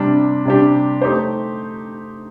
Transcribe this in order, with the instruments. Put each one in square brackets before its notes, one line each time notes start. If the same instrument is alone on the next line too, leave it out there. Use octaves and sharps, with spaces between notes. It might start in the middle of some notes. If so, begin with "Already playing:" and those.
Already playing: [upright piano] C3 G3 D4
C3 G3 D4 G4
A3 D#4 G4 C5